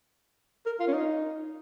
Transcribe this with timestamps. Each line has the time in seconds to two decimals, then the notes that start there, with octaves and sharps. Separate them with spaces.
0.66 A#4
0.80 F4
0.88 C#4
0.93 D#4